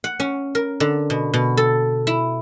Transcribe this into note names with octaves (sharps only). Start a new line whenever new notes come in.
F#5
C#4
A#4
D3
B2
B2
A4
E4